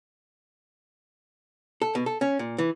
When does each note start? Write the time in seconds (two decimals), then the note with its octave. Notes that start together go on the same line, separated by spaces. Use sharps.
1.82 A4
1.95 B2
2.06 A4
2.21 C#4
2.39 A#2
2.58 E3